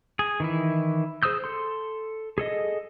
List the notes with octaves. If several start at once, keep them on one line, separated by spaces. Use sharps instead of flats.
G#4
D#3 E3 E4
G#4 C5 D#6 E6 G6
A4 C6
G#4 A4 D#5